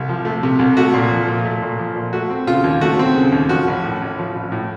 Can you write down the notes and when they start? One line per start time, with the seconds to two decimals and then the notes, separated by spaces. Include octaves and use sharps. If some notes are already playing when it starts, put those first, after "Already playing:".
Already playing: C2 C3 A3
0.09 F3
0.25 A3
0.43 C3
0.59 C2
0.77 A3 F#4
0.94 A#2
1.11 F3
1.28 A#2
1.45 A3
1.62 A#2
1.79 F3
1.96 A#2
2.13 A3 F#4
2.30 C4
2.47 C#3 F4
2.64 D#2
2.81 A3 F#4
2.99 C4
3.16 C#3
3.32 D#2
3.49 F3 F#4
3.68 A1
3.84 A2
4.02 A1
4.19 F3
4.36 A1
4.52 A2